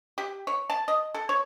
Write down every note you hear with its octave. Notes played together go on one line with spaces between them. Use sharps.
G4
C#5
A5
D#5
A4
C#5